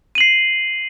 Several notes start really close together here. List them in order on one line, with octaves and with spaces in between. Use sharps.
D#7 F#7 C7